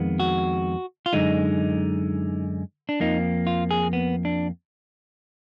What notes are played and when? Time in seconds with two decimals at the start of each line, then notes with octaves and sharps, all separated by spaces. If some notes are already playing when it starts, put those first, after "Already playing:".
Already playing: F2 D#3 G#3 B3
0.20 F#4
1.06 F4
1.13 F#2 D3 G#3 D#4
2.89 D4
3.00 F2 F3 A#3 D#4
3.47 F4
3.71 G#4
3.93 B3
4.25 D4